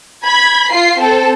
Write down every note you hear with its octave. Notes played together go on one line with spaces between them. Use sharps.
B5 G#6
F4 C7
C4 A4